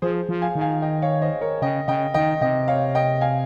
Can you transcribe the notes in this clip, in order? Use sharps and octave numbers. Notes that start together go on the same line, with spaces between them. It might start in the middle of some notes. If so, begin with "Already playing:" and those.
F3 G#4 C5
F3
F5 G#5
D#3
F5 G#5
D#5 G5
C#5 F5
C5 D#5
A#4 C#5
C#3 D#5 G5
C#3 D#5 G5
D#3 D#5 G5
C3 D#5 G5
C#5 F5
D#5 G5
F5 G#5